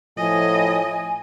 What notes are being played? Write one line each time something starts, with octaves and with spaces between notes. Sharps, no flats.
A2 F3 D#5 G#5